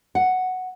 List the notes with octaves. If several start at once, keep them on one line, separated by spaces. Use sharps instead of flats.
F#5